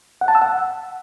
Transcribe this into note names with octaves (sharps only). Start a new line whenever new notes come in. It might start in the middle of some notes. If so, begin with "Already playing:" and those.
F#5
A5
E6
F#5